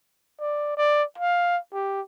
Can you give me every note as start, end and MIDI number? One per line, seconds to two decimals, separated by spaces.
0.40 0.74 74
0.77 1.03 74
1.18 1.58 77
1.73 2.01 67